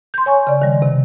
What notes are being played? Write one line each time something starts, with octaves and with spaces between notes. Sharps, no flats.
C6 G6
C#5 G#5 C#6
C#3 D5
D#3 G3
C3